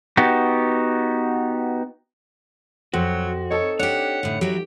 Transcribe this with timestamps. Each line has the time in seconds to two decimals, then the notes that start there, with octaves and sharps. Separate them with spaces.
0.17 B3 D#4 F#4 G4
2.94 F2 F#3 C4 F#4
3.51 D#4 A4 C#5
3.79 D4 G4 C#5 F#5
4.23 A2 D3
4.41 F#3 F#4 G4